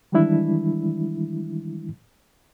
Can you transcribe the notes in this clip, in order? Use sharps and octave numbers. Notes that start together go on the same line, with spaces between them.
D#3 E3 G3 G#3 D4 E4